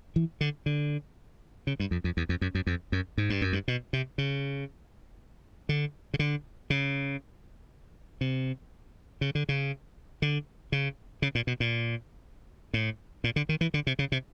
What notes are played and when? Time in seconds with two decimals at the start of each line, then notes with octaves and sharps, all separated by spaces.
0.16 E3
0.41 D3
0.66 D3
1.67 C#3
1.80 G2
1.91 F2
2.04 F2
2.17 E2
2.29 F2
2.41 F#2
2.55 F#2
2.67 F2
2.92 F#2
3.18 G#2
3.30 G2
3.41 F#2
3.53 G2
3.68 B2
3.93 C3
4.18 C#3
5.69 D3
6.14 C#3
6.19 D3
6.70 C#3
8.21 C3
9.21 C#3
9.35 D3
9.49 C#3
10.22 D3
10.72 C#3
11.22 C#3
11.35 A#2
11.47 B2
11.60 A#2
12.74 A2
13.24 A#2
13.36 D3
13.49 D#3
13.61 E3
13.74 D3
13.87 C3
13.99 C#3
14.12 C3